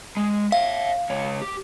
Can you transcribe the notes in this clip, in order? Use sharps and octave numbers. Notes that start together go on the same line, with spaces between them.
G#3
C#5 E5 F5
C#2 C#5
G4